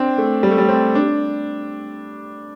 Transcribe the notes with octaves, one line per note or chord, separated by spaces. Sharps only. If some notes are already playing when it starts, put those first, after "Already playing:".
Already playing: C4 D4
A3
G3
A3
G3
C4
D4